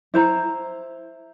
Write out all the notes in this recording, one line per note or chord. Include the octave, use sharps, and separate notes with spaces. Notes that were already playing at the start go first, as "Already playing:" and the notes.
E4 C5 A#5